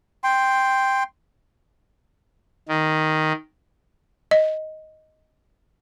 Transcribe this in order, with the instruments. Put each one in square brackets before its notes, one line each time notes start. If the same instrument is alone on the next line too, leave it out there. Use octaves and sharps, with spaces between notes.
[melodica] G5 C6
[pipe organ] D#3
[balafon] D#5